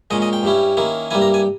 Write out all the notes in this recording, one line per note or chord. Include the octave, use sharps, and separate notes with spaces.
A#2 G#3 C#4 D#5
D#5
G5
G2 G3 C#4 E4
D#3 A#3 C#4 E4
G2 G3 A#3 E4 G#5
A#5
G#5